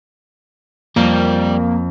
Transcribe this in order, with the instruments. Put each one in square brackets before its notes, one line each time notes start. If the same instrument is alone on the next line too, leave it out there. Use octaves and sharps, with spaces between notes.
[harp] F2 [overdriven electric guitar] G3 [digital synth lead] A#3